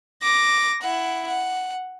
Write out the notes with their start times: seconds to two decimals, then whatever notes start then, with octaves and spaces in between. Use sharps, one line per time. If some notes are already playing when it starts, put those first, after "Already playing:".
0.22 D6 A#6
0.82 E4 F#5
1.27 F#5